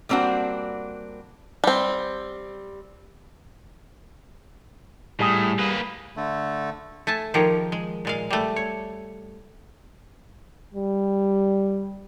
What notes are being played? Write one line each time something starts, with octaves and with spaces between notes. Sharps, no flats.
G3 A#3 C4 D4 F#4
G3 C4
A2 G3 G#4
A#3 B4
D3 A3
A3 G#5 A5
D#3 F3 G4 G#4 A#4 C#5
G#3
A#2 G#3 F5
G3 A3
C#5
G3